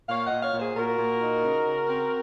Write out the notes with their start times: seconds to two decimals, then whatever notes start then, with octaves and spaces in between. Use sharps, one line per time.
0.09 A#2 C#5 F5
0.26 D#5 F#5
0.32 A#2
0.42 C#5 F5
0.54 A#2
0.60 G#4 C5
0.76 A#2 F#4 A#4
0.99 A#2
1.21 D#4
1.43 C#3
1.66 C#3
1.88 C4